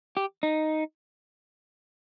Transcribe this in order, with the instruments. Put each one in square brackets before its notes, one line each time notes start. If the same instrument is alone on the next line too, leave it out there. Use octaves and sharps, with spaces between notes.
[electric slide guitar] G4
D#4